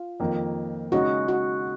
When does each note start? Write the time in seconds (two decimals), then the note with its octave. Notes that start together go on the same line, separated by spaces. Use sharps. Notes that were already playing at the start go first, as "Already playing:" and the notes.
Already playing: F4
0.20 F2 D#3 A#3
0.92 C#3 G#3 D#4 F#4
1.28 F#4